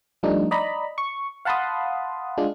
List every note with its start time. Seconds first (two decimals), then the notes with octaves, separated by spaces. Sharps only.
0.23 F3 G3 A3 D4 D#4
0.51 D5 D#5 A#5 B5
0.98 C#6
1.45 F5 F#5 A5 B5 C6 D#6
2.37 G#3 D4 F4